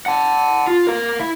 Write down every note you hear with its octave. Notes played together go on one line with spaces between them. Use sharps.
F#5 A5
F4
A#4 F5
E4